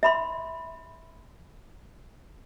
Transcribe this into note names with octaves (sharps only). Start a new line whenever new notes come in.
E5 B5 C6